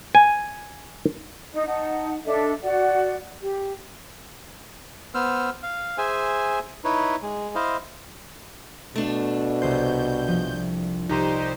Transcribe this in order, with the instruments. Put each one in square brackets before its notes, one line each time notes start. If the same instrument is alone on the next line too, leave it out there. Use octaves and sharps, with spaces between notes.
[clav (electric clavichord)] G#5
[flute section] D#4 D#5
D#4 F#5 A5
D4 A4 D#5 E5
F#4 D5 F#5
G4
[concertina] B3 C5 E6 F6
F5
G#4 C5 E5 G#5
D#4 E4 B4 C#5
G#3
E4 C5 D#5 F5
[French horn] B2 [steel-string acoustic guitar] A3 D4
[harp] C2 C5 [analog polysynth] G6
[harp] F3
[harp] C2 A#5 [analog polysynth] D#4 G4 C5